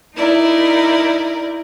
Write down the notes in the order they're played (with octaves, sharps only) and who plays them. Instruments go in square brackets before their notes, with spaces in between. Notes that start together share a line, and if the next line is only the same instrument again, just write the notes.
[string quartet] D#4 E4 A#4 D5